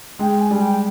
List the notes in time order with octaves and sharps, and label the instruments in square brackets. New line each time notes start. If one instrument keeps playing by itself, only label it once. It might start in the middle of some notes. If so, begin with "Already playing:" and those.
[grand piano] G#3 [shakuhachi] G5
[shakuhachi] G#5
[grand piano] G3
[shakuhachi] G5